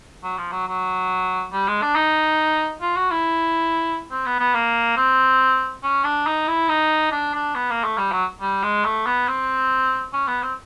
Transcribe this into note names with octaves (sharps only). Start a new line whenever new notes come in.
F#3
F3
F#3
F#3
G3
G#3
D4
D#4
F4
F#4
E4
C4
B3
B3
A#3
C4
C#4
D4
D#4
E4
D#4
D4
D4
B3
A#3
A3
G3
F#3
G3
G#3
A3
B3
C4
C#4
B3
C4